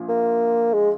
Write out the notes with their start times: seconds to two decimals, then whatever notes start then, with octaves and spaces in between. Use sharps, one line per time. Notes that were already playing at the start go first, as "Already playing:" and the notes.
Already playing: A#1 A#2 F3
0.09 A#3
0.74 G#3